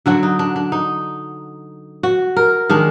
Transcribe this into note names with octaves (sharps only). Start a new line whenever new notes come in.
D3 F#3 D4 F#4
D#4
D4
D4
D#4
F#4
A#4
D#3 G#3 D4